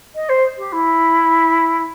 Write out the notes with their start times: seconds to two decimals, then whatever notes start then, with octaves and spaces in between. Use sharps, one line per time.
0.15 D#5
0.29 C5
0.57 G4
0.72 E4